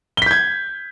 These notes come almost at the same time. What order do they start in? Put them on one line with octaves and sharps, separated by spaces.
G7 B6 G6 G#6